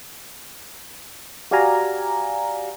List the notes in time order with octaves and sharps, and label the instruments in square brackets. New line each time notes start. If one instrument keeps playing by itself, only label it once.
[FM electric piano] F#4 G4 D5 F5 G#5 A#5